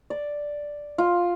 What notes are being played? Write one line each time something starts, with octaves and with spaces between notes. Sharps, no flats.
D5
F4